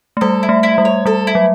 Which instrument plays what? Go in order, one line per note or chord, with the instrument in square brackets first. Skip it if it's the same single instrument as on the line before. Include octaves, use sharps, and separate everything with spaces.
[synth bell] A3
[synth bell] G3 [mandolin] A4
[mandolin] E4
[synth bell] A3
[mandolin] E4
[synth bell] G3
[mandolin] C#5
[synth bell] G3 [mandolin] A4
[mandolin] E4
[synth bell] F#3